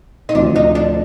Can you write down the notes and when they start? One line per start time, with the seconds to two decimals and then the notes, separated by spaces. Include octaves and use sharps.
0.29 D#4
0.35 D2 C3 F3 D4
0.56 D#4
0.75 D4